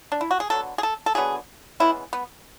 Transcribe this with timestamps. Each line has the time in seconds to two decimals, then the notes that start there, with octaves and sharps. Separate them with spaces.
0.12 D4
0.21 E4
0.31 F#4
0.40 G#4
0.50 D3 F#3 B3 A4
0.78 G#4
0.83 A4
1.06 A4
1.15 D3 F#3 B3 G#4
1.80 C#3 E3 G#3 B3 E4
2.13 B3